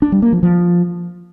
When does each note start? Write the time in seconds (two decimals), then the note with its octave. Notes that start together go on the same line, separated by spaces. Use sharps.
0.02 D4
0.12 G3
0.22 A#3
0.33 F3
0.43 F3